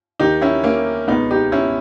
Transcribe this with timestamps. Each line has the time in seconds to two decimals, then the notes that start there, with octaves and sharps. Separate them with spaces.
0.20 D#2 D#3 D#4 G4
0.42 C#4 E4
0.64 A#3 C#4
1.08 C#2 B2 B3 D#4
1.31 D#4 G4
1.52 C#4 E4